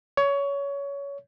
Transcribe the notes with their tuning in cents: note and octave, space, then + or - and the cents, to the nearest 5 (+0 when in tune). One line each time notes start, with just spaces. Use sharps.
C#5 +20